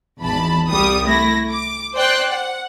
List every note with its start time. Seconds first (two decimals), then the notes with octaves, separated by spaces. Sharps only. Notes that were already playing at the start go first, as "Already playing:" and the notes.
0.21 G#1 E2 A5 B5
0.67 C2 G3 D#6
1.05 A3 E4 A#6
1.49 D6
1.95 C5 D5 G5 F#6 C7
2.31 F#5